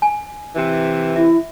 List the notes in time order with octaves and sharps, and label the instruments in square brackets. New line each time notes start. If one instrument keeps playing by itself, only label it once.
[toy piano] G#5
[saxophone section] C3 E3
[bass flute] E4 [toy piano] E5